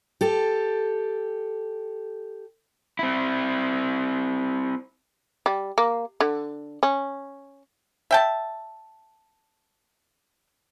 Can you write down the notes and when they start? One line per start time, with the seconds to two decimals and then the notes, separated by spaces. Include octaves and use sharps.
0.21 G4 A4
2.99 C4 E4
5.46 G3
5.78 A#3
6.20 D3
6.83 C#4
8.11 E5 G5 A5